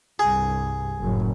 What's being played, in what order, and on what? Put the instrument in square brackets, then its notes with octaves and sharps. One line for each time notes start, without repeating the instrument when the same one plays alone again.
[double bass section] C2 G2 [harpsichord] G#4
[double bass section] F#1 F#2 A2